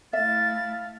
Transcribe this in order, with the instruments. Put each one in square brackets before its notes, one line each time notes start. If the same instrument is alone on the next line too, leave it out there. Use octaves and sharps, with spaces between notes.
[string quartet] A3 E4 [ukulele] E5 [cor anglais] F5 [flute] A6